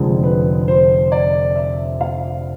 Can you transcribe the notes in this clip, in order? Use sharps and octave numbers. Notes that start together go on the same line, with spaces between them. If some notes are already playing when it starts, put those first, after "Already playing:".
Already playing: F1 F2 D3 G#3
B4
C5
D5
E5
F5